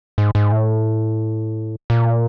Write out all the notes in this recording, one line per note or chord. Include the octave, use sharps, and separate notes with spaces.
G#2
G#2
A2
A#2